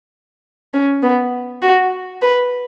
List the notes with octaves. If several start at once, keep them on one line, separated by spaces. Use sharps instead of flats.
C#4
B3
F#4
B4